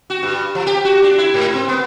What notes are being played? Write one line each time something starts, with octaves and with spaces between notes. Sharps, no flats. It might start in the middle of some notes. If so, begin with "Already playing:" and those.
F#4
G2
F3
G4
F#4
D4
E4
G#2
C4
B3